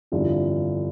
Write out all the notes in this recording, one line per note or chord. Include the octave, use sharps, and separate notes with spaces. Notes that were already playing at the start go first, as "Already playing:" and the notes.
G1 F2 E3 G3 D4 F4